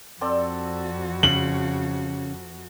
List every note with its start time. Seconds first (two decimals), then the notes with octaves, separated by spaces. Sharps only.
0.21 F2 C4 F#4 A4 D5
1.23 C#3 F#7